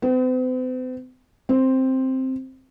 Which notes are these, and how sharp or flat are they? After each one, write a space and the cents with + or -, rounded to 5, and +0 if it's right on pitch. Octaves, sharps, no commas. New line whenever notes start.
C4 -45
C4 +5